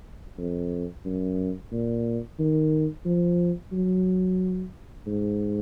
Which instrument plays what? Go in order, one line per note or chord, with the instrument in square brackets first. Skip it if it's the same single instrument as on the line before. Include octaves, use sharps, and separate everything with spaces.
[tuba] F2
F#2
A#2
D#3
F3
F#3
G#2